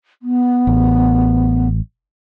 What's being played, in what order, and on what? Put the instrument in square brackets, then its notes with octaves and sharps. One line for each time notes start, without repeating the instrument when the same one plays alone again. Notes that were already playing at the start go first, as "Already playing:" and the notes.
[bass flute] B3
[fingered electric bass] A1